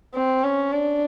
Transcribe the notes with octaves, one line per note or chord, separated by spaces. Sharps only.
C4
C#4
D4